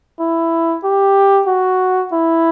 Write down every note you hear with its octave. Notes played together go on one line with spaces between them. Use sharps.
E4
G4
F#4
E4